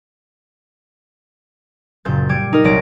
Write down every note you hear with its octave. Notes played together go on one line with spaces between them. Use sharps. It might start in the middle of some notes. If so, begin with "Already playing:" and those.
F#1 A#2 G6 A6
G3 D6 G#6 D7
D#4 A#4
C2 F#3 C#5 D5 A#6 D7